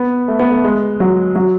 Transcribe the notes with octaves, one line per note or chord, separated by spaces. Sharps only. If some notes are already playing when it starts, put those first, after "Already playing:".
Already playing: B3
A3
B3
A3
G#3
F#3
F#3